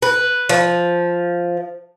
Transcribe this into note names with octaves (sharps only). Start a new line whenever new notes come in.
B4
F3